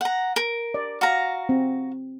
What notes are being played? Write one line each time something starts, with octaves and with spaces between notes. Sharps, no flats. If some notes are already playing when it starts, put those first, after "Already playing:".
F#5 A#5
A#4
D5
F#4 F5 A#5
C4